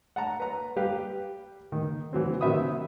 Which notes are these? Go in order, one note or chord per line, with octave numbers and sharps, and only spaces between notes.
F#5 A5 A#5
B4 A#5
G3 G4 B4 F5
D#3
E3 F#3 C4
C3 D#3 F#3 E5 B5 D#6